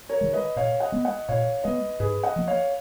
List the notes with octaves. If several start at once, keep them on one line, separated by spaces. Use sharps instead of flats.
A#4 C#5
D#3 G#3
B4 D#5
A#2 C#5 F5
D#5 F#5
G#3 B3
D#5 F#5
A#2 C#5 F5
G#3 B3 B4 D#5
G#2 G#4 B4
D#5 F#5
F3 A#3
C#5 F5